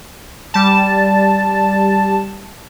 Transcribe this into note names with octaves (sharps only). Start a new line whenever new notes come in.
G3 A5